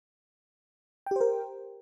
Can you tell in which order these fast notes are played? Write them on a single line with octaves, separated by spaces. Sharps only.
G5 G4 C5 A#4